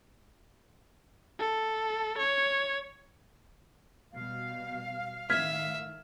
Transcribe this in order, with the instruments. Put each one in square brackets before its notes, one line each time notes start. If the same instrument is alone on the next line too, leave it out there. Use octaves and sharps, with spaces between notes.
[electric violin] A4
C#5
[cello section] B2 G3 [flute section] F5
[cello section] A2 D#3 [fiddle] E5 [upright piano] F6 G#6 B6